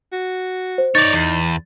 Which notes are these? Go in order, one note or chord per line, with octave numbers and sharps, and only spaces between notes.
F#4
C5
D#4 C#5 D5 A6
E2